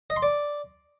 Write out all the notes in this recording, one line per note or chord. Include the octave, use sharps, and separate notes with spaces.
D#5
C6
D5